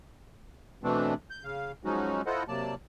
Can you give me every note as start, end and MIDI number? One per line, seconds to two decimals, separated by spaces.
0.83 1.14 47
0.83 1.14 52
0.83 1.14 57
0.83 1.14 60
0.83 1.14 62
1.30 1.44 91
1.44 1.72 49
1.44 1.72 77
1.84 2.22 53
1.84 2.22 54
1.84 2.22 56
1.84 2.22 61
1.84 2.22 63
1.84 2.22 66
2.26 2.43 64
2.26 2.43 65
2.26 2.43 69
2.26 2.43 72
2.26 2.43 75
2.26 2.43 78
2.48 2.75 48
2.48 2.75 54
2.48 2.75 58
2.48 2.75 74
2.48 2.75 81